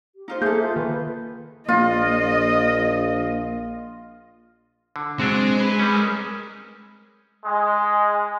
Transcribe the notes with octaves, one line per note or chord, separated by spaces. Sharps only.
G4
D#4 F4 C5
A#3 G#4 A4 E5 G6
F4
D#3 B4
A#1 A#3 F4 D#5
D3
F#3 G#3 C4 D4 F#4
B4
G3 C#4
A#4 D#6 E6
G#3